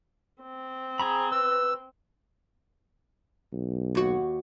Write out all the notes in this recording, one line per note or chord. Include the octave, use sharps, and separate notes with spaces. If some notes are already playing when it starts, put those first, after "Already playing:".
C4
G#4 A#5 B5
B4 E6
B1
D#2 F#4